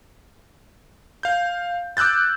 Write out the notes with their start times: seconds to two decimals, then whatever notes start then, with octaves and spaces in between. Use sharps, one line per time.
1.23 F5 G6
1.97 D6 E6 F#6 G6 A6